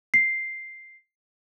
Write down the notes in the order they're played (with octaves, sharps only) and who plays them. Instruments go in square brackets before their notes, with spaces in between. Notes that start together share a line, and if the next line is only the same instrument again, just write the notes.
[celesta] C7